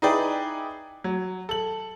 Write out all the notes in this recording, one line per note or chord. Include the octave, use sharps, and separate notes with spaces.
D#4 E4 G#4 B4 D5 G5
F#3
A4 F#7